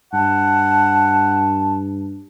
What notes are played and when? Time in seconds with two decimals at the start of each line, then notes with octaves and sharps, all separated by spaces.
0.14 G2 F#5 A5